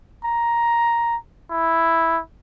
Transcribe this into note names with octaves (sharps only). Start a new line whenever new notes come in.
A#5
E4